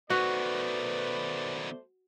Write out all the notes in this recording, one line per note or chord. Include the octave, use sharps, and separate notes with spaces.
B2 D#3 A3 F#4 B4 C5 D5